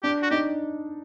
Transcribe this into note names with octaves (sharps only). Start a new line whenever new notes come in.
D4 G4
F#4
D#4 G4